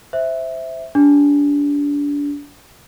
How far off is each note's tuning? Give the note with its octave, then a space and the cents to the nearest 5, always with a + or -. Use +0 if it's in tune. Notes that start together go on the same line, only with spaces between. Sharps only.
C5 +0 E5 -5
D4 -30 G4 +0